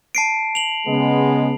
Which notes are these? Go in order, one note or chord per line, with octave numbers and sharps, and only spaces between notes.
A5 C7 D7
F7 F#7
C#3 G#3 B3